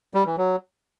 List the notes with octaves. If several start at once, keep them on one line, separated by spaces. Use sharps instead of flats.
G3
E3
F#3